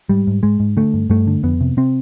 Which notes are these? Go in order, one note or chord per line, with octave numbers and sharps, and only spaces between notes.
G#2 G3
G#2
G#2 G#3
G#2
D3 A3
G2
G2 A3
D3
F2 B3
C3
C3 C4